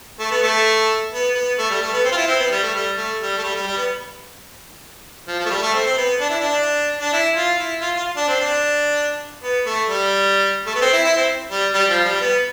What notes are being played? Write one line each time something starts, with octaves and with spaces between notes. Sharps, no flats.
A3
B3
A3
B3
B3
A3
G3
A3
B3
C4
F4
E4
C4
B3
G3
A3
G3
A3
G3
A3
G3
G3
G3
B3
F3
F3
A3
G3
A3
C4
C4
B3
D4
E4
D4
D4
E4
F4
E4
F4
F4
D4
C4
D4
B3
A3
G3
A3
B3
C4
E4
E4
C4
G3
G3
F3
G3
B3